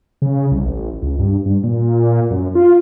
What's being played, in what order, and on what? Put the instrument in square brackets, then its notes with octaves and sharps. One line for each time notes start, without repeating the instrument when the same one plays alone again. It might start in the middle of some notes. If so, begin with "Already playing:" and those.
[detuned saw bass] C#3
C2
A1
C#2
G2
G2
A#2
F#2
F4